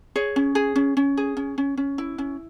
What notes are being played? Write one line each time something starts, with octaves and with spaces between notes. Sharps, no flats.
G#4 C#5
C#4
G#4
C#4
C#4
G#4
C#4
C#4
C#4
E4
C#4